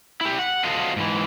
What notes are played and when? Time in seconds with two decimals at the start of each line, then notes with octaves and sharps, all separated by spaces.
0.21 E4 G4
0.39 F#5
0.64 F4 F#4 A4 C5 D#5 F5
0.96 G#2 E3